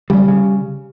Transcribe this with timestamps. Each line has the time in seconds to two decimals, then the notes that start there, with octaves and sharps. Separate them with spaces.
0.10 C#3 G3
0.28 C#3